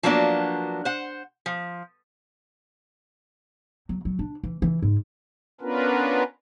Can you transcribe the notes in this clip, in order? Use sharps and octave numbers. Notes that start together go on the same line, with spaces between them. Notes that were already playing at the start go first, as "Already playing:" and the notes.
F3 F#3 A#3 B3 D4 F#4
C5 F#5
F3
F#3
F#3
D4
E3
E3
G#2
B3 C#4 D4 F4 A#4 B4